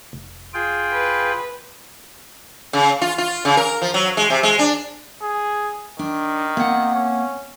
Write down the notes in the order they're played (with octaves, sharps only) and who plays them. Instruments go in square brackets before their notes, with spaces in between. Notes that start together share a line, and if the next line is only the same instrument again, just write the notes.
[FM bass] F1
[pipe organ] F4 G#4 G5
[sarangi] B4
[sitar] C#3
F4
F4
C#3
A#4
F3
F#3
G#3
C3
G#3
D4
[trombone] G#4
[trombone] D#3 [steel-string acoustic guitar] D4
[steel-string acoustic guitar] A#3 C4 F#5
[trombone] C#4